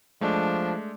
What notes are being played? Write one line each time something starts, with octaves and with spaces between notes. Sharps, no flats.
F3 G#3 A3 D4